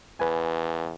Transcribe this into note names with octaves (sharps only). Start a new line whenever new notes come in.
E2 B4 G#5